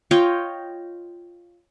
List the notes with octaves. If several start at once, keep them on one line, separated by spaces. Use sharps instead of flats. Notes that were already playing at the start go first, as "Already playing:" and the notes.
F4 C#5 D#5 G5